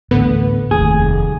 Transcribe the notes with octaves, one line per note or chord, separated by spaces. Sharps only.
A1 D2 A2 D3 B3 B4
F1 D#2 G#4